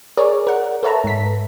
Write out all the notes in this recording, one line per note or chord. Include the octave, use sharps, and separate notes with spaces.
G#4 A#4 C#5 D5
A#4 F#5
A4 B4 C#5 E5 A5 A#5
G#2 B6